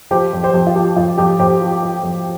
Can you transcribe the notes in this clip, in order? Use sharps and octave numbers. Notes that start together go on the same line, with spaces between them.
F3 G4 C5
F2
G4 C5
F2
F4
F3 G4
F2 F4
F2 G4
F2 G4 C5
F3
F3
F2